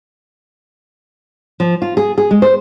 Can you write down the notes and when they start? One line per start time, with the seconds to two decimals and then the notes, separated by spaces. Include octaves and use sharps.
1.60 F3
1.82 F4
1.97 G#4
2.18 G#4
2.31 G#3
2.42 C5